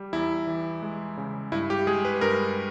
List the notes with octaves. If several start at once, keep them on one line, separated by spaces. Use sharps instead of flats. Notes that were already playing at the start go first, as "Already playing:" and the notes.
Already playing: G3
E2 E4
E3
G#3
C#3
G2 E4
G4
G#3 G#4
B4
G2 A#4